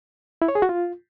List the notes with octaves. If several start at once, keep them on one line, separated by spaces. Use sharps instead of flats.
E4
C#5
G#4
F#4
F4